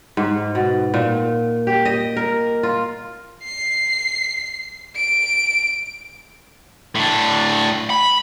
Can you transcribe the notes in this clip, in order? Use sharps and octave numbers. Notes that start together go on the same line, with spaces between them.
G#2
B2
A#2
G4
D#5
A#4
F4
C7
D7
A2 D4
B5